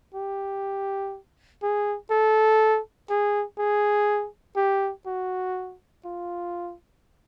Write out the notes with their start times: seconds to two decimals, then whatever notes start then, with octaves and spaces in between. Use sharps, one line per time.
0.14 G4
1.63 G#4
2.11 A4
3.10 G#4
3.59 G#4
4.56 G4
5.06 F#4
6.05 F4